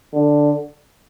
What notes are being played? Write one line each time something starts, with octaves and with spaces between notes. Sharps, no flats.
D3